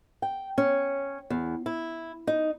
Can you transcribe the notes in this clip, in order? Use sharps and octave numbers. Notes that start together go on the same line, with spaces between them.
G5
C#4
E2
E4
D#4